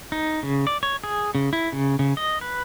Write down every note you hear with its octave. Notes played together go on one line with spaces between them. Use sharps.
D#4
C#3
D5
C#5
G#4
C#3
E4
C#3
C#3
D#5
B4